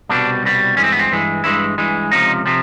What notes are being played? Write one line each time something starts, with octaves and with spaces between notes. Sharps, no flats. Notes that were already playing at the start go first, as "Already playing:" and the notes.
C2 B2 G3 D4
C2 B2 G3
G2 E3 G#3 C#4
C4
B3
C4
G2 E3 G#3
G2 E3 G#3 E4
G2 E3 G#3
C#2 C3 F3 D#4
C3 F3